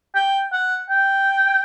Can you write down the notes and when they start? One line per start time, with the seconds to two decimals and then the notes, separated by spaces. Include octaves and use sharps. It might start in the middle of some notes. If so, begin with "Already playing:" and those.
0.15 G5
0.53 F#5
0.90 G5